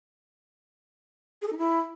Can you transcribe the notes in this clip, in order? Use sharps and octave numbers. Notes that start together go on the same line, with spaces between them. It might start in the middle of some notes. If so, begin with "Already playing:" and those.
G#4
A4
D#4
E4